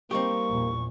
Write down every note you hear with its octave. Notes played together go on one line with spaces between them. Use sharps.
G3 A#3 C4 D#4 G4 C#6
A#1 E2